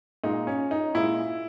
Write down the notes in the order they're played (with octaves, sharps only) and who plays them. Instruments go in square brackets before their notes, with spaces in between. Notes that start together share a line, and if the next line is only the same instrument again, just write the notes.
[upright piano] A#2 G#3 D#4
C#4
D#4
A#2 G#3 E4